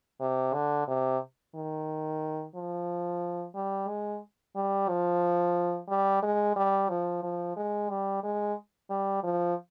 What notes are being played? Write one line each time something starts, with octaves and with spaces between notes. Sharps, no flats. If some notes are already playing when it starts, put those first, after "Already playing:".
C3
D3
C3
D#3
F3
G3
G#3
G3
F3
G3
G#3
G3
F3
F3
G#3
G3
G#3
G3
F3